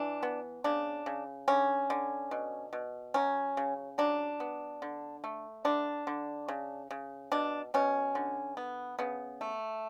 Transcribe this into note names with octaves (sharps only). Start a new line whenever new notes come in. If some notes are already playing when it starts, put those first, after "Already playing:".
Already playing: E3 D4
B3
C#3 D4
C#3
D3 C#4
D3
B2
B2
F#3 C#4
C#3
F#3 D4
B3
D3
A3
D3 D4
D3
C#3
C#3
B2 D4
B2 C#4
D3
B3
C#3 B3
A3